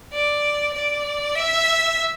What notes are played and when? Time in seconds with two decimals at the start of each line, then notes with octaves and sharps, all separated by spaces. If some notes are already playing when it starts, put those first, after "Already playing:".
0.13 D5
0.74 D5
1.36 E5